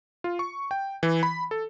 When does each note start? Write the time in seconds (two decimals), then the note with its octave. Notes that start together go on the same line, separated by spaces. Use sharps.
0.24 F4
0.39 C#6
0.71 G5
1.03 E3
1.23 B5
1.51 A4